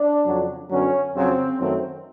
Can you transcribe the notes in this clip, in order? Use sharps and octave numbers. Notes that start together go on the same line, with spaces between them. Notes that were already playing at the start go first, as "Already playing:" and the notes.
Already playing: D4
F2 C#3 F#3
F#2 D3 F#3 B3 C#4
F2 C#3 F#3 C4
F#2 D#3 F#3 A3 C4